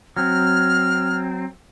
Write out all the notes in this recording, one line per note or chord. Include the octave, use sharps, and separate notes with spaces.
F#3 C4 F6